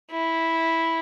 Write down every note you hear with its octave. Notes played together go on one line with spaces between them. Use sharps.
E4